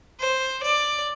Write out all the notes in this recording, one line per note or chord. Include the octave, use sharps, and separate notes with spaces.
C5
D5